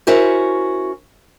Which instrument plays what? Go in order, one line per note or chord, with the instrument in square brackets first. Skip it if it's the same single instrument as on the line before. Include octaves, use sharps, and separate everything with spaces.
[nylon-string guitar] C#4 E4 F#4 A#4 C5